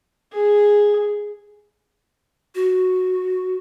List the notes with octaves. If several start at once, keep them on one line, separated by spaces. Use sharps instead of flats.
G#4
F#4